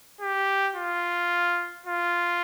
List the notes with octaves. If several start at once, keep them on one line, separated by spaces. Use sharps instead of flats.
G4
F4
F4